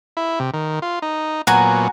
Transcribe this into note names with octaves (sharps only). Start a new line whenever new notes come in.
E4
C3
D#3
F4
D#4
A#2 F#3 B3 F#4 G#5 A#5